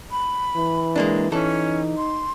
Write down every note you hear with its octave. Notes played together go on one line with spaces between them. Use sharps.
B5
E3
G#3 A#3 D4
E3 C#4 D#4 A4
C6